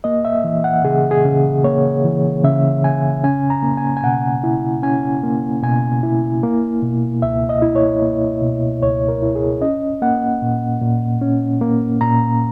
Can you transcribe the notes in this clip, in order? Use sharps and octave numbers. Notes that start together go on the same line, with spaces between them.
A#3 D#5
E5
E3
F#5
C#3 G#4
G#4
C#3
A#3 C#5
E3
C#3 E5
C#3 G#5
C#4 G#5
A#5
A#3
G#5
G#5
B2 F#5
E4
C#4 G#5
A#3
B2 G#5
E4
A#3
B2
C#2 E5
D#5
E4
C#5
A#3
B2
C#2 C#5
A#4
E4
G#4
C#4 D#5
A#3 F#5
A#2
A#2
C#4
A#3
A#2 A#5